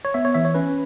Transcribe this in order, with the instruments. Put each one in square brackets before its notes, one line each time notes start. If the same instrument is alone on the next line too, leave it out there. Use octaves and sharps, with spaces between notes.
[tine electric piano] C#5
B3 E5
C#5
E3 E5
C#5
C#4 B4